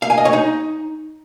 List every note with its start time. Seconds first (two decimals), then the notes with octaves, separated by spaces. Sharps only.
0.02 F5
0.10 G#5
0.18 D#5
0.25 C#5
0.33 D#4